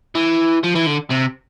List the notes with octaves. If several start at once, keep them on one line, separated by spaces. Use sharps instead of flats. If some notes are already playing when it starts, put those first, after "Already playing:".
E3
F3
E3
D3
C3